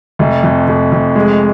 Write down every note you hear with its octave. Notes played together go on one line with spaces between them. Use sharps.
F1
F2
F1
F2
G#3